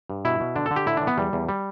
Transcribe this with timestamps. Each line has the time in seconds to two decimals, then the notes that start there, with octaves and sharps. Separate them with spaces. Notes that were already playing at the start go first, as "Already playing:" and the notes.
0.10 G2
0.25 B2 E4
0.40 B2
0.55 D3 D4
0.66 A4
0.71 D3
0.76 G4
0.86 A2 E4
0.97 E3 D4
1.07 B3
1.17 E2 G3
1.33 E2
1.49 G3